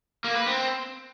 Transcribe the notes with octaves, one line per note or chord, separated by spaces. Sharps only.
A#3
B4
C4